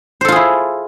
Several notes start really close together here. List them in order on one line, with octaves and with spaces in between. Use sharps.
C5 A4 F4 G#4 E4